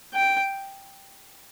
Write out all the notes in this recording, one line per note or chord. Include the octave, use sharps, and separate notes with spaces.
G5